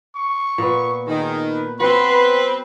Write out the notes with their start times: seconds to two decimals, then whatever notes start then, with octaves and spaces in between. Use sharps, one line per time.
0.16 C#6
0.58 A#2 B3
1.08 D#3 G#4
1.50 B4
1.80 F#3 B3 C4 F#4 B4 C6